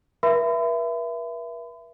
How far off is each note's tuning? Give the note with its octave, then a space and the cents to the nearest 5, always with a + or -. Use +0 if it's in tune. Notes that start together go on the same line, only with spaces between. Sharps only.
B4 -45 E5 +20 B5 +40